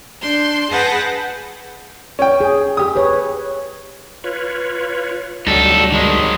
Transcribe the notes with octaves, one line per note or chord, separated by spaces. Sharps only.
D4 C6 G6
G#4 B4 F#5 G5 A5 A#6
C#4 G5
G#4
G4 D#6
B4 C#5
F4 B4 C#5
D2 F#3 G3 D#4 A4
D#3 G#3